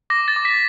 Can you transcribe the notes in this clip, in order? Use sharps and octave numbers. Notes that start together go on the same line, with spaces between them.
D6 A#6
A6
D6
B6